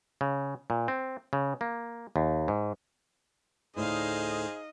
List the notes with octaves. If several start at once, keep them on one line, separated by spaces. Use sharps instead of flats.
C#3
A#2
C4
C#3
A#3
D#2
G#2
D2 A2 D#4 E4 G#4 C5 D#5 F5